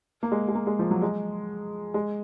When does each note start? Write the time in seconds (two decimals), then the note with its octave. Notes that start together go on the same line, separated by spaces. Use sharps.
0.23 A#3
0.32 G#3
0.48 G#3
0.55 A#3
0.67 G#3
0.79 F3
0.91 F#3
1.02 G#3
1.94 G#3